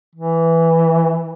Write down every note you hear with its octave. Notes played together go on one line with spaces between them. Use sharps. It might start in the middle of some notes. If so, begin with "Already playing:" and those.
E3